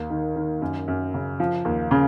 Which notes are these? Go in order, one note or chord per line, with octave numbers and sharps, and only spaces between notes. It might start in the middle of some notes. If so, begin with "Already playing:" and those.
Already playing: D#2
D#3
D#3
F#2
F#2
C#3
F3
D#2
C#3